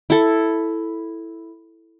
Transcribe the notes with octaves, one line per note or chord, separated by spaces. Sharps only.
E4 A4